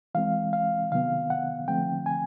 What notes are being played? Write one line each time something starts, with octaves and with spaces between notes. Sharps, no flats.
E3 G#3 C4 F5
F5
C3 D#3 F#3 B3 F5
F#5
D3 F3 A3 C4 G5
G#5